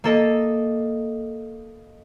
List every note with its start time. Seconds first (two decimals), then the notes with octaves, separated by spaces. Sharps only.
0.04 A#3 A4 D#5